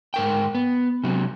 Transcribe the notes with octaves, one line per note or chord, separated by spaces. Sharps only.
G#2 A#4 G5
B3
C3 F#3